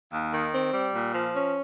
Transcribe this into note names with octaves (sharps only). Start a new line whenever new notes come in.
D#2
D#3
C4
G3
A#2
F3
C#4